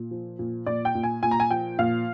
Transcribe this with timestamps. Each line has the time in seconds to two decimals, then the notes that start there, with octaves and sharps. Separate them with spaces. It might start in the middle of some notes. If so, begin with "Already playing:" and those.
Already playing: A#2
0.11 F3
0.39 A#2
0.66 A#2 D5
0.85 G5
0.95 A#2
1.03 G#5
1.23 A#2 G#5
1.31 A#5
1.40 G#5
1.51 F3 G5
1.79 A#2 F5